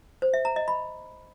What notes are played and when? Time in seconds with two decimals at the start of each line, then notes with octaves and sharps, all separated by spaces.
0.22 C5
0.34 E5
0.45 A#5
0.56 D#5
0.68 B5